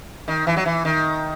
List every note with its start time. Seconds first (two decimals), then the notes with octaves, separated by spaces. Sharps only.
0.28 D#3
0.47 E3
0.57 F#3
0.66 E3
0.85 D#3